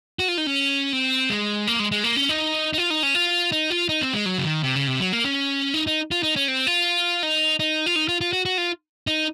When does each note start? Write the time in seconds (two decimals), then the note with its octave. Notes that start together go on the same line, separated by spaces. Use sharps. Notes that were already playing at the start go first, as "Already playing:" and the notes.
0.19 F#4
0.28 F4
0.38 D#4
0.47 C#4
0.93 C4
1.30 G#3
1.67 A#3
1.79 G#3
1.92 G#3
2.04 A#3
2.16 C#4
2.29 D#4
2.73 D#4
2.78 F4
2.90 D#4
3.03 C#4
3.15 F4
3.52 D#4
3.70 F4
3.89 D#4
4.01 C4
4.13 G#3
4.26 F#3
4.38 C#3
4.45 D#3
4.63 C3
4.76 C#3
4.87 C3
5.00 F#3
5.13 A#3
5.25 C#4
5.74 D#4
5.87 D#4
6.11 F4
6.23 D#4
6.36 C#4
6.48 C4
6.67 F4
7.23 D#4
7.59 D#4
7.86 F4
7.96 D#4
8.08 F4
8.21 F4
8.33 F#4
8.45 F#4
8.58 F4
9.07 D#4